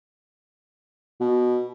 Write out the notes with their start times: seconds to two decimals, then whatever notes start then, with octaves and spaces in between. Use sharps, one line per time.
1.20 B2